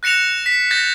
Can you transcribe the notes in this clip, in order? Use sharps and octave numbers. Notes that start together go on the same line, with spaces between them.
F#6 A#6 C#7 E7 F7
B6
G6 A6 A#6